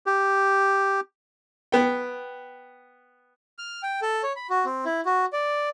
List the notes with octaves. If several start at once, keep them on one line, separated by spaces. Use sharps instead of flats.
G4
B3 G5
F6
G5
A4
C#5
B5
F#4
C4
E4
F#4
D5